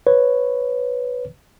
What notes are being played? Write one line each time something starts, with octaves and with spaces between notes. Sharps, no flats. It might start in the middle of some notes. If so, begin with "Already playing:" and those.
B4 C#5